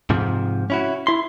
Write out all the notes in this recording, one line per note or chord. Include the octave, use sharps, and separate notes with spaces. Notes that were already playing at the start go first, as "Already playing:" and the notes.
G#2 C3 F3
C#4 E4 F#4
E4 C6